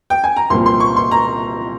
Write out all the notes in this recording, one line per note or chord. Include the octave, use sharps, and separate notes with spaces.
G5
G#5
A#5
C2 A#2 F3 C6
C6
C#6
C6
A#5